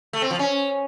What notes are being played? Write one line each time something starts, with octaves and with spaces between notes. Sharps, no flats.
A3
C4
F3
C#4